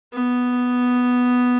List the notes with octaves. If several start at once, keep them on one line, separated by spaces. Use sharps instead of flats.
B3